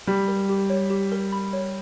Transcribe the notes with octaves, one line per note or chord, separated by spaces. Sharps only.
G3 G4
A#4
G4
C#5
G4
A#4
B5
C#5